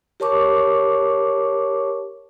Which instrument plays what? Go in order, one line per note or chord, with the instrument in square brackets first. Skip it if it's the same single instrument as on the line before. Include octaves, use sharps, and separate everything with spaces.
[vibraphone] G4 A#4 C#5 A5 C#6 D6